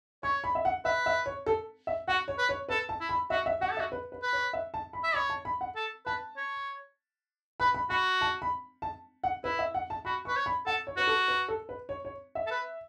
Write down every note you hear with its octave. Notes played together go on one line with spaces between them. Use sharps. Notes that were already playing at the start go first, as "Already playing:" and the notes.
C#5 C#6
B5
E5
F#5
B4 E5
E5
C#5
A4
E5
F#4 F#5
C#5
B4
C#5
A4 B4
A5
E4
B5
F#4 E5
E5
F#4 F#5
A4
E5
F#4
B4
B4
B4
C#5
E5
A5
B5
E5
C#5 B5
A5
B5
F#5
A4
B4 A5
C#5
B4 B5
B5
F#4 B5
A5
B5
A5
F#5
E4 B4
E5
F#5
A5
F#4 B5
B4 C#6
C#5
B5
A4 F#5
C#5
F#4 B4
A4
B4
A4
B4
C#5
C#5
E5
A4
B4